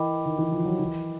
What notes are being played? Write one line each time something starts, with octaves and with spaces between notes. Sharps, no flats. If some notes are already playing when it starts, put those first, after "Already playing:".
Already playing: E3 A#4 D#5 G5 B5 D6
D#3
E3
F3
F#3
E3